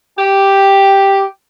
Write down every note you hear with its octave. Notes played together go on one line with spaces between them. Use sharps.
G4